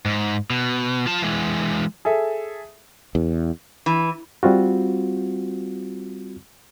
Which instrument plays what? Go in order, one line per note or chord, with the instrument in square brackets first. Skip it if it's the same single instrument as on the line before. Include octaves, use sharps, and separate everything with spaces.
[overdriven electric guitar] G#2
B2
F4 A5
E3 G#3
[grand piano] G#4 A4 E5
[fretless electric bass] E2
[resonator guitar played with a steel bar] E3
[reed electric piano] G3 C4 F4 F#4